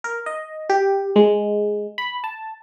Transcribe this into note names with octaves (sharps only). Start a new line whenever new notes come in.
A#4
D#5
G4
G#3
B5
A5